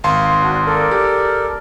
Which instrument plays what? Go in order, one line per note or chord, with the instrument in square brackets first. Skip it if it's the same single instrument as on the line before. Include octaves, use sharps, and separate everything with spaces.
[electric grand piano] G#1 F5 C6
[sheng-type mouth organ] D4 F#4
A4 A#4 D5
[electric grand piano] G4